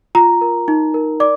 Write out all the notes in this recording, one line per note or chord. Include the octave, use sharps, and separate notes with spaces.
F4 A#5
A#4
D#4
A#4
D5 D6